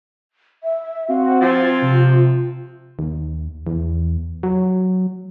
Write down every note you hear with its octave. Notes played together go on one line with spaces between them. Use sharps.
E5
C4 F#4 F5
F3 C4 F4 C5 G#6 A6
C3
D#2
E2
F#3